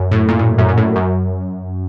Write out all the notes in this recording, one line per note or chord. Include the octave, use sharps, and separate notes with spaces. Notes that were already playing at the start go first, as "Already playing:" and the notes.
Already playing: F#2
A2
A#2
A2
F#2
F#2
A2
F#2